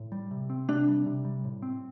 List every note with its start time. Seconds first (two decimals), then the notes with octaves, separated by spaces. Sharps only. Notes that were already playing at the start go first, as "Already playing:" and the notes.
Already playing: A2
0.12 G3
0.31 C3
0.50 C4
0.69 C3 D4
0.88 G3
1.06 C3
1.25 G3
1.44 A2
1.62 C4